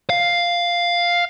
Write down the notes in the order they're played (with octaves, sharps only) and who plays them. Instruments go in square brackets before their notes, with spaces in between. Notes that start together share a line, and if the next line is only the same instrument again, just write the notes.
[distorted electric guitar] F5